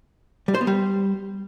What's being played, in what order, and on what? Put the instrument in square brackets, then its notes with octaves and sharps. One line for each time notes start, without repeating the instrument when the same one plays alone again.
[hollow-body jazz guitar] G3
C5
B3
G3